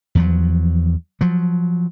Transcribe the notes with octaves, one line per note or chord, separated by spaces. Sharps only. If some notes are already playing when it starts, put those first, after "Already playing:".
E2 F3 F#3
F3 F#3